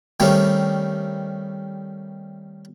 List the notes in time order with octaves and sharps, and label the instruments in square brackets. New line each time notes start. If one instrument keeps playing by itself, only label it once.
[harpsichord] D#3 G3 A3 C4 C#4